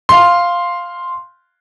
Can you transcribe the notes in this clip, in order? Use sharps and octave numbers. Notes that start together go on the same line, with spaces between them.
F5 C6